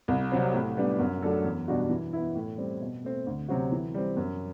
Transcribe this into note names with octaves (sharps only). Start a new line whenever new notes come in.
C2
C3 F#3 C4
A2
G3 B3 D4
F#2
F#3 A3 D4 A4
E2
B2 G3 D4 F#4
E3
B3 E4
A2
G3 C4
B2
A3 C4
D2
C3 F#3 C4 F#4
E3
G3 C4
F#2